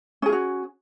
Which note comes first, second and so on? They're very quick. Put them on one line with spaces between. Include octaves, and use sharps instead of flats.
C#4 G#4 F4 F#4